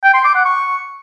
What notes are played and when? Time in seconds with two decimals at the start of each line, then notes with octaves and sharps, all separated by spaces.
0.04 G5
0.14 C6
0.25 D6
0.35 F#5
0.45 C#6